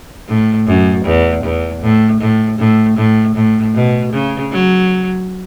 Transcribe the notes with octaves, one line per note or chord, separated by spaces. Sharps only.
A2
F#2
E2
E2
A2
A2
A2
A2
A2
B2
C#3
F#3